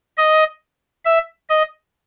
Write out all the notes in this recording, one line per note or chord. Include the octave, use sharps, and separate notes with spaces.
D#5
E5
D#5